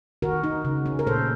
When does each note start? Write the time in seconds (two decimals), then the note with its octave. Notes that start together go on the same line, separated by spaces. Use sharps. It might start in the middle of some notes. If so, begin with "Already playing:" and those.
0.22 D#3 F#4 A#4
0.43 D#4
0.65 C#3
0.86 C#4
0.99 A#4
1.07 A#2 A4 C5